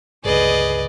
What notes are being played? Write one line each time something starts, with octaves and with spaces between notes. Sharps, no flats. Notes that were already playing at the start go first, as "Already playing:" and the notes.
G1 C#2 G#4 B4 D5 D#5